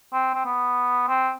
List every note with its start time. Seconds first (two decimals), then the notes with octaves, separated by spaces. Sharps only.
0.13 C4
0.34 C4
0.45 B3
1.08 C4